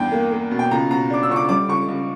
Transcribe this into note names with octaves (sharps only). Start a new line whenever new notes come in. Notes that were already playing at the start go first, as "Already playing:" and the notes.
Already playing: E2 G2 G5
A#3
A#3
B2
G5
C#2 A#5
B2 A#5
D4 D6
E6
C#2 C#6
D6
G3 D6
C#2 C#6
C#2